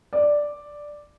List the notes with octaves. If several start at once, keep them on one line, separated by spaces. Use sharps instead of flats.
D5